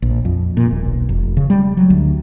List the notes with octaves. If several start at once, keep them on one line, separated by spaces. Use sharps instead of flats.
A#1
F2
A#2
D#1
B1
F1
C#3
G3
F#3
D2